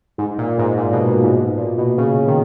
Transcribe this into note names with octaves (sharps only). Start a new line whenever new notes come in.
G#2
A#2
G#2
A#2
B2
A#2
G#2
A#2
B2
C#3
D#3